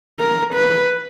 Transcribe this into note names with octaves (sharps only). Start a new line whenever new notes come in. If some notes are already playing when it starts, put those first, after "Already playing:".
A#4
B4